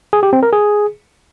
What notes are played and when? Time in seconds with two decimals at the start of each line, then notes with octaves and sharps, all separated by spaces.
0.13 G#4
0.23 G4
0.33 C4
0.43 A#4
0.53 G#4